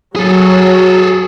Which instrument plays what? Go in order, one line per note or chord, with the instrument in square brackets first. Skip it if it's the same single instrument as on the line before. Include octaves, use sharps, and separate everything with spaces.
[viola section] F#3 [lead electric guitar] G#4 A4